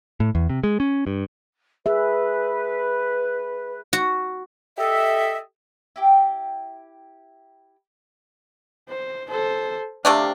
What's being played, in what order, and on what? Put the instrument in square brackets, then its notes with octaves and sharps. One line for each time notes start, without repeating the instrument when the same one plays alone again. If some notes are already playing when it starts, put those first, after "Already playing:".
[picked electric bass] A2
E2
C3
G#3
C#4
G2
[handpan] G#4 E5 [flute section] B4
[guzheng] F#4
[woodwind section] G4 A4 D#5 E5
[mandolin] E4 G4 G5
[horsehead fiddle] C5
A4 C5
[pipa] C3 A3 D4 [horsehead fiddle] G4 F5